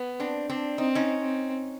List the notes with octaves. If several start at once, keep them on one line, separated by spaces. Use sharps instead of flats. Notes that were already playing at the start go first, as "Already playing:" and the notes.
Already playing: B3
C4 D4
C4 D4
C4 D#4
C#4 D#4
C4